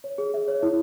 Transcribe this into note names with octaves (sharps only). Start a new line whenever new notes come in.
C#5
G#4
E5
C#5
E4